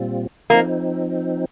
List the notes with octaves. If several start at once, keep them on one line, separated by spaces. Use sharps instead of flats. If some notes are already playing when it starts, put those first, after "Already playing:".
Already playing: A#2 G3 C4 F4
F3 A#3 C4 D#4